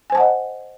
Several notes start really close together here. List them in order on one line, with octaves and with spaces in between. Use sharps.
G#5 C5 A5 F#5 D#5